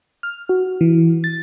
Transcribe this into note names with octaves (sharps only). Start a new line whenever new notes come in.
F6
F#4
E3
A6